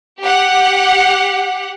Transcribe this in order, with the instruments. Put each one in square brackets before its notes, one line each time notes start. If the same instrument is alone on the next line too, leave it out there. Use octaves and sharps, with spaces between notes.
[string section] G4 F#5